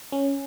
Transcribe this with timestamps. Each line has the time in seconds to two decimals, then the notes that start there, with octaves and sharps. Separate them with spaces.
0.12 C#4